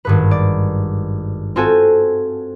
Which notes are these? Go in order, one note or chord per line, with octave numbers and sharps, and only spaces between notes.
G#1 G2 B4
D5
C4 F4 F#4 A4 C5 G#5